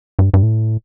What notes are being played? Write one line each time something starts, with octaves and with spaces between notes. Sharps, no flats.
G2
G2
A2